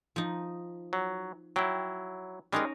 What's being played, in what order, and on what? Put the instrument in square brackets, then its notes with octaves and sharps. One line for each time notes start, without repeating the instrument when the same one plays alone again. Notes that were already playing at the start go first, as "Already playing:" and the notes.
[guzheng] F3 D#4
[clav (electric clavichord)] F#3
[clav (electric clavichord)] F#3 E4 [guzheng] G5
[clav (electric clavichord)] G3 G#3 [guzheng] C#4 D#4 A#4